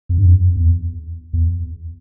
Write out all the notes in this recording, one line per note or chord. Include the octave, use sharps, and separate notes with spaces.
F2
G2
F2
E2
E2